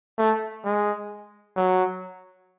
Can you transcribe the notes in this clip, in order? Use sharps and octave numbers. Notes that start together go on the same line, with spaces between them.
A3
G#3
F#3